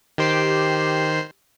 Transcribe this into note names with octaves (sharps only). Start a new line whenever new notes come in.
D#3 G4 C5 C7